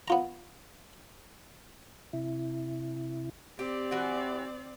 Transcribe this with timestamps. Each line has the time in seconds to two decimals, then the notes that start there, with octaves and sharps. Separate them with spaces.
0.08 B3 F4 A#5
2.13 C3 E4
3.59 C4 G4 D5
3.91 E3 F#4 G4